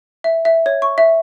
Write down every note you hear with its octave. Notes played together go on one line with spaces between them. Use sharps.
E5
E5
C#5
C#6
E5